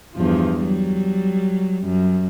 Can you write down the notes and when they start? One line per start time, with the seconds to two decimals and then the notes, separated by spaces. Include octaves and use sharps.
0.15 E2 G2 F3
0.64 F#3 G3
1.84 F#2